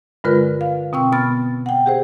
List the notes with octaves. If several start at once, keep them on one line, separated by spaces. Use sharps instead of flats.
G2 D3 G#3 F4 A#4 B4
F5
B2 C4 G5 C#6 E6
B2 B3 B5 F6 A6
F#5 G5
G4 G#4 C5